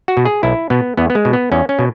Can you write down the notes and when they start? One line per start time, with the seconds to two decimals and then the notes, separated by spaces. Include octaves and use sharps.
0.08 F#4
0.17 B2
0.25 G#4
0.43 B1 E4
0.70 B2 B3
0.97 E2 B3
1.10 B3
1.15 G#3
1.25 B2
1.33 B3
1.51 E2 C#4
1.69 C#4
1.79 B2